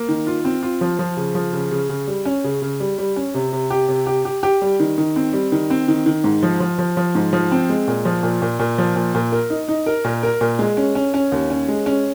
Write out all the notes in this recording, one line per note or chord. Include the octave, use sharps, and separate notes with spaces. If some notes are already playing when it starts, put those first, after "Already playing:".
Already playing: A#3
D#3
F4
C4
F4
F3
F3
C#3
F3
C#3
C#3
C#3
G3
C#4
C#3
C#3
G3
G3
C#4
C3
C3
G4
C3
G4
G4
G4
G3
D#3
D#3
C4
G3
D#3
C4
D#3
D#3
G#2
F3
F3
F3
F3
G#2
F3
C4
G#3
A#2
F3
A#2
A#2
A#2
F3
A#2
A#2
A#4
D#4
D#4
A#4
A#2
A#4
A#2
G#3
C#4
C#4
C#4
D#2
C#4
G#3
C#4